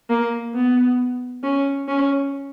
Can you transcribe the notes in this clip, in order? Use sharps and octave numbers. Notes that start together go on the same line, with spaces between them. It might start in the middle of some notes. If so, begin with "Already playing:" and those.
A#3
B3
C#4
C#4